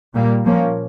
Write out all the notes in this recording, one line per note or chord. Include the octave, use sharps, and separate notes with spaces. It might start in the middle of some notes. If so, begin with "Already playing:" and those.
A#2 G3 A#3
A#2 F3 A#3 C#4